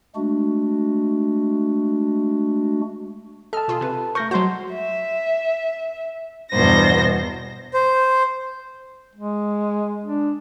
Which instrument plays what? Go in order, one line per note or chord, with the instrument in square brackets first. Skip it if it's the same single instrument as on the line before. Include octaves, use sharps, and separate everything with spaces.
[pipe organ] G#3 A3 D4 F#4
[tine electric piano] A4 A5 [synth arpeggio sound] D#5 F6
[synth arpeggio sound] B2 F4 G#4
C3 B4
[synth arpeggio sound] A3 A#4 [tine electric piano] C#6 G6 A#6
[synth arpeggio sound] F#3 G#3 C5 [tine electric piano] F#4 C6
[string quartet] E5
E2 G2 B2 C5 A#6
[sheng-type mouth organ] C5
[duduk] G#3
D4